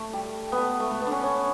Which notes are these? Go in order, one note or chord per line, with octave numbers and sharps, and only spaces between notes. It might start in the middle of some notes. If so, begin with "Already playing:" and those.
Already playing: A3
G3
B3
A3
A3
A3
B3
D4
C#4
C#4